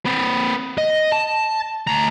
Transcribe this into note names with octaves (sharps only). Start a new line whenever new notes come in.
C4 B4
D#5
A5
D2 A#5